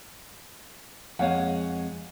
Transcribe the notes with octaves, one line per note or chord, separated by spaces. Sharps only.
F2 G#3 C#5 F5 F#5